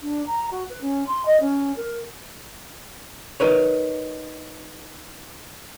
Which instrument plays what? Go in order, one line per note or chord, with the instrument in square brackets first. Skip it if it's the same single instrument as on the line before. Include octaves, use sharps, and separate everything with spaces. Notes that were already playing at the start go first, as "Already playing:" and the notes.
[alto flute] D4
A#5
F#4
B4
C#4
C6
D#5
C#4
A#4
[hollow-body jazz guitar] D#4 A#4 B4 C#5